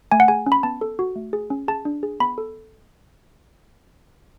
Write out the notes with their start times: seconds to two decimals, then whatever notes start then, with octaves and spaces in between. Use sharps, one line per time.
0.12 A3 G#5
0.20 F#5
0.28 G#4 G#5
0.46 C#4
0.52 B5
0.63 B3 A5
0.81 A4
0.99 F#4
1.16 A3
1.33 G#4
1.50 C#4
1.68 G#4 A5
1.85 D4
2.03 G#4
2.20 B3 B5
2.38 A4